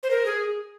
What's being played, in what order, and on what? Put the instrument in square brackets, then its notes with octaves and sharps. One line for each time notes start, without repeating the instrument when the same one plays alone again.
[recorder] C5
A#4
G#4